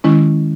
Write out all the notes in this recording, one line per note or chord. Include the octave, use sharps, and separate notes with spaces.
D#3 G#3 C#4 E4